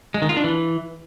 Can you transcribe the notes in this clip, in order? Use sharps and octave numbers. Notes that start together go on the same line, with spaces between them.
G#3
D#3
F4
D4
E3